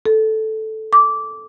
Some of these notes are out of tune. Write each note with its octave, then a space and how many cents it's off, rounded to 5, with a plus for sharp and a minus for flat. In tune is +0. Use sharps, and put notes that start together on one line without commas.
A4 -5
D6 -15